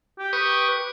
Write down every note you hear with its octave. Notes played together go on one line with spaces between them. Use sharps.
G4
B4 C#6 D#6